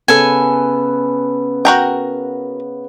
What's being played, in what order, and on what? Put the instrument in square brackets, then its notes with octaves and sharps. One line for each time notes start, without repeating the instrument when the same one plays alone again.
[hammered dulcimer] C#3 B3 [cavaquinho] A4 G#5
[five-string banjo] F#4 A#4 G5